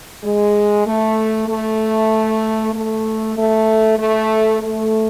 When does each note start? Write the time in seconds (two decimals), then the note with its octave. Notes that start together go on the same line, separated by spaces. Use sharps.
0.24 G#3
0.87 A3
1.48 A3
2.74 A3
3.37 A3
3.98 A3
4.62 A3